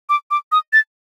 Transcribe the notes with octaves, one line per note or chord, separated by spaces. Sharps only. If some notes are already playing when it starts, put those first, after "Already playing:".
D6
D6
D#6
A6